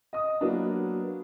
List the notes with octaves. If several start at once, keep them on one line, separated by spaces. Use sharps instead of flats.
D#5 D#6
F#3 A#3 B3 D4